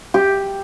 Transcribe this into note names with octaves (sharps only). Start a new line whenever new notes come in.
G4